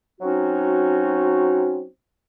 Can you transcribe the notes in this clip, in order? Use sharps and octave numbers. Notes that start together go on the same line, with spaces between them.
F#3 C4 C#4 D#4 F#4